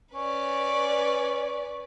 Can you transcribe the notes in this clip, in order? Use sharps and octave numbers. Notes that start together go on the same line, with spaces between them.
C#4 B4 D5